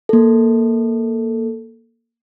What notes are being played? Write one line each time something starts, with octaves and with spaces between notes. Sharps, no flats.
A#3 A4